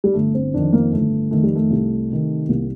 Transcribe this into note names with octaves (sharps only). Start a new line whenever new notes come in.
G3
G1 A3
C4
F2 D#3 D4
A#3
G1 A3
F2 D#3 A3
G3
A3
C2
C3 D#3
C2 A#3